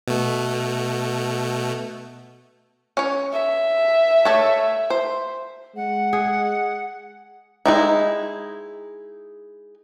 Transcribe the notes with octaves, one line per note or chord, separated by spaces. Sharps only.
B2 A3
C#4 C#5
E5
A3 A4 C#5
C5
G#3 F#5
G#4
G#3 D#4 E4